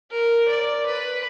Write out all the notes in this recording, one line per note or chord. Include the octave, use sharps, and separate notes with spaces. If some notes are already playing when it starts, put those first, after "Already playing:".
A#4
D5
B4